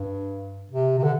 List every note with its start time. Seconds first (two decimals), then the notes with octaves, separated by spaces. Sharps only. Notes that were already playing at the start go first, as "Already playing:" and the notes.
Already playing: G2
0.71 C3
0.99 C3
1.04 D3